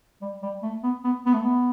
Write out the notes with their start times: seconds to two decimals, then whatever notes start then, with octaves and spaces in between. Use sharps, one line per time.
0.22 G3
0.42 G3
0.63 A3
0.83 B3
1.04 B3
1.26 B3
1.33 A3
1.43 B3